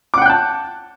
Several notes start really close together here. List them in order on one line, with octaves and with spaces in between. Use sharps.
D6 F#5 G5 F#6 A5